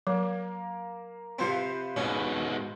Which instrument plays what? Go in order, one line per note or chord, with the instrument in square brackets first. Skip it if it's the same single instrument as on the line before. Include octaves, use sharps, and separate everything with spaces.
[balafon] F#3 [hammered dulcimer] A#3
[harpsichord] C3 F3 C4 [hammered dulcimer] B4 C5 F5
[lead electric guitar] G#2 B2 [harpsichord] C#4